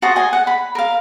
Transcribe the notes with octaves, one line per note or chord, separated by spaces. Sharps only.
F#4 C5 A5 D#6
D#5 G#5
F#5
B5
A#4 F5